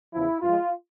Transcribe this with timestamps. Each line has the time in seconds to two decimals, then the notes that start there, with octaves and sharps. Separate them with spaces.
0.13 E2 C#3 F3 E4
0.42 G2 F3 G#3 F4